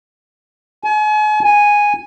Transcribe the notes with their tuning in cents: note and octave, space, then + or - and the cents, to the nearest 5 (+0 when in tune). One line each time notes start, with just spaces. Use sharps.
G#5 +40
G#5 -5